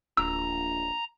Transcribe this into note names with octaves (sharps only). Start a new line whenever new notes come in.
D1 A#1 A#5 E6